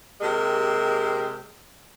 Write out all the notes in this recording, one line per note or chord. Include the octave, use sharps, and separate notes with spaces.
C3 G#3 A#3 G4 A#4